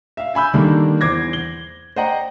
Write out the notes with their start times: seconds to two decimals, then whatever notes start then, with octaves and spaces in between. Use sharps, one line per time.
0.17 E5 F5
0.34 E5 G#5 B5 E6 G6
0.53 D3 D#3 G3 A#3 D4
1.01 E2 C5 D6 G#6 A#6
1.33 G7
1.96 C5 D5 D#5 F#5 G5 A#5